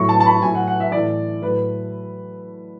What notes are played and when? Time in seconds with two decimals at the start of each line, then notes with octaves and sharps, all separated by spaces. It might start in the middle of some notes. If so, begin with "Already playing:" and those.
Already playing: A2 F#3 C#6
0.09 A5
0.20 A5
0.26 B5
0.42 A2 F#3 G#5
0.55 F#5
0.68 F#5
0.80 E5
0.92 A2 E3 D5
1.42 A2 F#3 B4